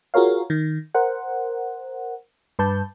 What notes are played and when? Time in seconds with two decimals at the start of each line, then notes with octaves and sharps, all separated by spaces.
0.14 F4 F#4 G#4 A#4 C#5 F5
0.50 D#3
0.95 A#4 C5 F#5
2.59 G2 B4 A5 G6